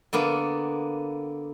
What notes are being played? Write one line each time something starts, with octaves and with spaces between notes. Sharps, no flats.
D3 A#3 B3 B5